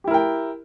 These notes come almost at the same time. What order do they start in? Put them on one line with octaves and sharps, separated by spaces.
G4 E4 A#4 G5